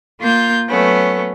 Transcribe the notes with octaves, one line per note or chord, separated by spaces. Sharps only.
A#3 F4 G6
F#3 A3 B3 C#4